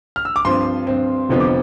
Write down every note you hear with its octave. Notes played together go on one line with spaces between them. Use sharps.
F6
E6
D6
G2 F3 C4 C6
G2 F3 C4
F1 F2 D3 F3 B3
D6